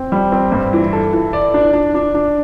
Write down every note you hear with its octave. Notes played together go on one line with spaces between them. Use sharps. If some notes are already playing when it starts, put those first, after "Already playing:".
Already playing: C4
G3
C4
G2
E3
A4
E3
D5
D4
D4
D4
D4